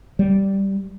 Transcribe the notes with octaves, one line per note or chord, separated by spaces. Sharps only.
G3